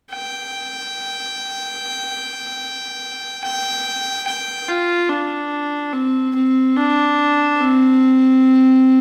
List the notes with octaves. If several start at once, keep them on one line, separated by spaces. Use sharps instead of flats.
G5
G5
G5
F4
D4
C4
C4
D4
C4